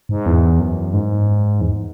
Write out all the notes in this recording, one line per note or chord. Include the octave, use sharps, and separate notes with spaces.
G#2
E2
F#2
G#2
E2